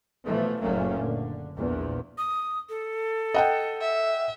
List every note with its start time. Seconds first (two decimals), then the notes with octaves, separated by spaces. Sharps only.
0.25 B2 E3 F3 A3
0.61 F#1 A#2 F#3 A3 A#3 C#4
0.98 D3
1.56 A#1 E2 A#2
2.18 D#6
2.69 A4
3.34 D#5 F#5 G5
3.81 E5